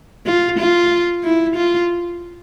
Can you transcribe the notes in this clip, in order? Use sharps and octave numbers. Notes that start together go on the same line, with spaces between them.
F4
F4
E4
F4